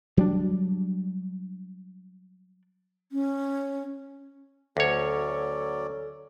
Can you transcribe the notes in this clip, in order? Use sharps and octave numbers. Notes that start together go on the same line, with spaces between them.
F#3 G3 D4
C#4
D2 F#3 C#4 A4 C#5 D5